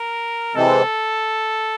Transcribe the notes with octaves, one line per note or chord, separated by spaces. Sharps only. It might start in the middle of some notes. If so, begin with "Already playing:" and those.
Already playing: A#4
C3 E3 G#3 C4 A4